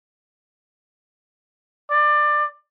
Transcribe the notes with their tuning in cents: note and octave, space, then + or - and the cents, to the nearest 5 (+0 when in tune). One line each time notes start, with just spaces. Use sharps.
D5 +20